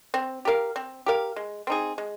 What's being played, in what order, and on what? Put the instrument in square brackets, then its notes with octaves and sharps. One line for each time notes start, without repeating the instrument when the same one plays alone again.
[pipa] C4
G4 A#4 F5
C4
G4 A#4 F5
G#3
C4 D#4 G#4
G#3